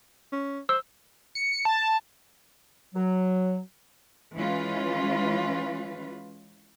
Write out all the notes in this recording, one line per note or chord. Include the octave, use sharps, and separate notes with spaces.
C#4
C5 E6
C#7
A5
F#3
E3 G#3 C#4 F4 B4